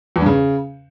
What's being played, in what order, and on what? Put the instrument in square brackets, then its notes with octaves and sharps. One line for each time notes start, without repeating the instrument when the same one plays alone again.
[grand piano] E2
G2
C#3